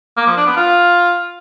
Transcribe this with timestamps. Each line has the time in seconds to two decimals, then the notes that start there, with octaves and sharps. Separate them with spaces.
0.17 A#3
0.27 F3
0.37 D4
0.47 B3
0.57 F4